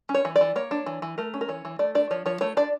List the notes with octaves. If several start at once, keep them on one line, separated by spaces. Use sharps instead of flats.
C#4
C#5
E3
D5
E3
A#3 C#5
D4
E3
E3
A3 A#4
C#4
A#4
E3 C#5
E3
A3 D5
D4 D5
F3 C#5
F3 C#5
A3 C#5
D4 D5